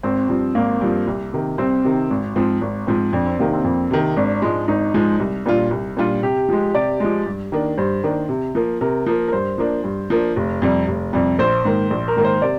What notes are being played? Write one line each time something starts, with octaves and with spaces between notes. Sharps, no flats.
G#1 C4
G2 F3
G#1 A#3
G2 F3
C2
C3 D#3
C2 C4
C3 D#3
G#1
G#2 F3 C4
G#1
G#2 F3 C4
F2 D4
C4
C3 D#3 A#3
C4
F2
C3 D#3
G#1 D4
G#2 F3 G#3
G#1 D#4
G#2 F3 G#3
C2
A#2 G3 D4 F4
C2
A#2 G3 D4 F4
C3 G4
F3 G#3
C3 D5
F3 G#3
G2
D#3 A#3 D4
G2 C5
D#3 A#3 D4
C3
F3 A#3
C3 A#4
F3 A#3
A#4
G2 C5
F3 A#3 D4
G2
F3 A#3 D4
F1
F2 C3 G3
F1
F2 C3 G3
A#1 C5
G#2 D#3 A#3
A#1
A#4
G#2 D#3 A#3
C5
C3 D5